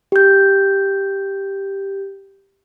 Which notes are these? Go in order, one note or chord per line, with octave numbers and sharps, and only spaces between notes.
G4 G6